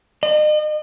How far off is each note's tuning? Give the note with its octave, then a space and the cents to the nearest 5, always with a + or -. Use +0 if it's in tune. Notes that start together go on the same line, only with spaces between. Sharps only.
D#5 -40